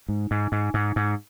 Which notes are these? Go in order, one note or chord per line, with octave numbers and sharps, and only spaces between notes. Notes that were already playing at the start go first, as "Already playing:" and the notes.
G#2
G#2
G#2
G#2
G#2